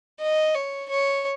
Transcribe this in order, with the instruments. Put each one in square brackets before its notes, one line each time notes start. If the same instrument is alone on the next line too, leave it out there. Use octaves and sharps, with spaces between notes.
[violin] D#5
C#5
C#5